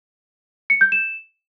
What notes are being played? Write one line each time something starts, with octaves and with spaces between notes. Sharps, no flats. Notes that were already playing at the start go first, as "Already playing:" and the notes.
C#7
G6
E7